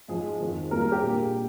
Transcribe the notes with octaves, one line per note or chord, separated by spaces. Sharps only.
G#2 F3 G#3 G#4
F2 D#3 G#3 C4 F4
G#2 G3 A#3 F4 A#4
A#4
G4
A#2 G#3 D4 F4